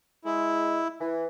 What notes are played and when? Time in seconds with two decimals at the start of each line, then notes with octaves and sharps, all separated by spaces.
0.25 G#3 E4
1.01 E3